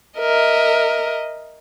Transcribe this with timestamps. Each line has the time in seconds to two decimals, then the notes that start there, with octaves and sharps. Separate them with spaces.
0.19 A#4 D#5 E5